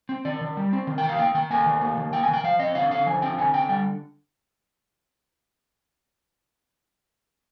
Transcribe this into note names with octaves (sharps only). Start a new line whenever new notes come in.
C4
D#3 D5
D#3
G3
C4
D#3
G5
D#3
F5
A#3 G5
D#3 G5
A#3 G#5
D#3
A#3
D#3
A#3 G5
D#3 G#5
G5
F3 F5
C4 D#5
D3 F5
D3 F5
F3 G#5
C4 G5
D3 G#5
D3 G5
G3 G5